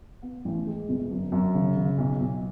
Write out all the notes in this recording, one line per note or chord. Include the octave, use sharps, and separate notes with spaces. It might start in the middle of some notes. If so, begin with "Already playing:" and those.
B3
A1
G#3
G1
F#2
F#2
C#3
C#3
B1
B1